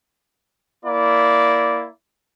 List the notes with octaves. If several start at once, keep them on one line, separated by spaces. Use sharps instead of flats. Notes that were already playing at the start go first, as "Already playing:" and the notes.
A#3 E4 D5